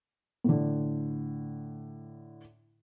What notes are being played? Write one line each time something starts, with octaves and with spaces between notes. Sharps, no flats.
A2 D3